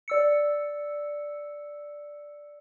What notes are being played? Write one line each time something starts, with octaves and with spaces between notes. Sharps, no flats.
D5 E6 C#7